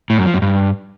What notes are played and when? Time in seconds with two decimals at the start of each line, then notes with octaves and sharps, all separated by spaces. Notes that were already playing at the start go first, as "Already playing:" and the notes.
0.10 A2
0.18 F#2
0.26 F3
0.34 F#2
0.42 G2